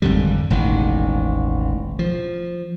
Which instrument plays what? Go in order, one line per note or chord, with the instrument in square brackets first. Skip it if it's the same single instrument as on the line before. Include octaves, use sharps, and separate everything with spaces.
[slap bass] G#1 F2 D3 G3
E1 A1 D#3
F3